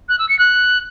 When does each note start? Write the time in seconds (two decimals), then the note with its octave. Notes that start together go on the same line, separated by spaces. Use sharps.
0.09 F#6
0.19 E6
0.29 C#7
0.39 F#6